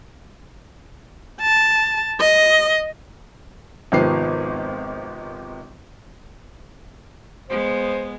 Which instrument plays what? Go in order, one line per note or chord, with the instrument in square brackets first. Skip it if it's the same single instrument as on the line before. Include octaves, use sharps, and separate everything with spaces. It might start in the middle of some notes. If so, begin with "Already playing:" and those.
[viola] A5
D#5
[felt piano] G#1 C3 D#3 F3 B3 C7
[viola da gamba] G#3 B3 [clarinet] C5